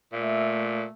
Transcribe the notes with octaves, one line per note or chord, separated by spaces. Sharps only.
A#2 A3 E5